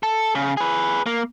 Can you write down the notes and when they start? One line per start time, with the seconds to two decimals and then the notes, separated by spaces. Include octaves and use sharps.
0.03 A4
0.35 C#3
0.57 G#4 B4
1.06 A#3